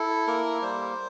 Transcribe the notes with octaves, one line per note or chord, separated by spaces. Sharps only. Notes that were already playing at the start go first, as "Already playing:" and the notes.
Already playing: E4 A4
A#3 A#4
G3 C5